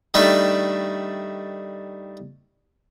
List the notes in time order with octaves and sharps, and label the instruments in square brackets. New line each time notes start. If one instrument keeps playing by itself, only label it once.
[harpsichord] D#3 G3 A3 D4 B4